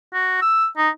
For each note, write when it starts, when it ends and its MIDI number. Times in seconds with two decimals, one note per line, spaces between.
0.14 0.37 66
0.42 0.67 88
0.77 0.89 63